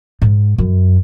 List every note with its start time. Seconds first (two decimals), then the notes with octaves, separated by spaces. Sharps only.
0.22 G#2
0.58 F#2